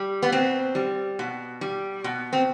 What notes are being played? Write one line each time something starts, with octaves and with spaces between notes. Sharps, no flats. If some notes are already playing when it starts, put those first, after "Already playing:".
Already playing: G3
B3
B2 C4
G3
B2
G3
B2
C4